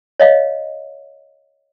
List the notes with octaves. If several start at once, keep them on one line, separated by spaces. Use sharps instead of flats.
C#5 D#5 F5